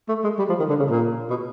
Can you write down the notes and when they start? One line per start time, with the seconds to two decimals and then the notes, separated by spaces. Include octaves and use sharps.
0.09 A3
0.24 G#3
0.39 G3
0.49 F3
0.59 D#3
0.70 D3
0.79 C#3
0.90 A#2
1.30 B2